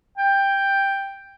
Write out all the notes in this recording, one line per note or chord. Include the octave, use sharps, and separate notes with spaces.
G5